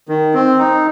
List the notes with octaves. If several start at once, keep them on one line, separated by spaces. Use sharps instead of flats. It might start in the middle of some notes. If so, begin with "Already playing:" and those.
D#3
C4
D#4